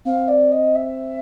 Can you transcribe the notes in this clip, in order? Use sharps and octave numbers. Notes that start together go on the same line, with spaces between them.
C4 F5
D5
D#5
E5